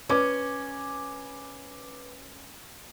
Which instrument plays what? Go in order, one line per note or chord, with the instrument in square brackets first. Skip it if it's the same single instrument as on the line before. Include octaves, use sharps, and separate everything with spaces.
[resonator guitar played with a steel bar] C#4 [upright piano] B4 D6